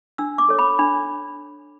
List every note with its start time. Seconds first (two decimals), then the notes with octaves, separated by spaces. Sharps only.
0.18 D4 E6
0.38 D6
0.49 A4 C#5
0.59 B5
0.79 D4 B5